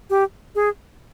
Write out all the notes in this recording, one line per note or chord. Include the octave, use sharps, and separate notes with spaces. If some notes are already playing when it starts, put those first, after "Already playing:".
G4
G#4